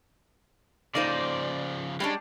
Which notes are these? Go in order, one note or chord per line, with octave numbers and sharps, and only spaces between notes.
C#3 F3 A#3 D#4 C5 D5
G3 G#3 C#4 D4